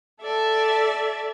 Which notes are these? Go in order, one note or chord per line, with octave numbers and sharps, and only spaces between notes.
A4 D5 E5